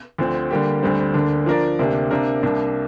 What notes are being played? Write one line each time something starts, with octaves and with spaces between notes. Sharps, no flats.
D2 D3 F3 C4
D3 G3 A#3 G4
D2 D3 G3 C4
D2 D3 A#3 D4
F3 D4 A#4 D5
D2 C3 A#3 D4 G4
C3 A#3 D4 A#4
C2 C3 A#3 D4